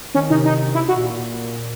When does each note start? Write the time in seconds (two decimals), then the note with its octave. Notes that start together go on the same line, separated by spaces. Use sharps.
0.15 D#3 C#4
0.30 C3 D#4
0.45 D#4
0.75 E4
0.88 F#4
0.95 A#2